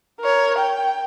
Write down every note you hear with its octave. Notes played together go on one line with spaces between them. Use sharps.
A#4 C#5
G5